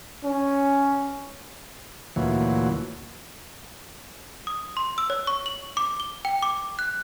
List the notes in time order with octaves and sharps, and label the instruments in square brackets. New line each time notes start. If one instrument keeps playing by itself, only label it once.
[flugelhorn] C#4
[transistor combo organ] D2 A#2 E3 F#3
[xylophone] D#6
C6
E6
C#5
C#6
F#7
D6
G7
G5
D6
F#6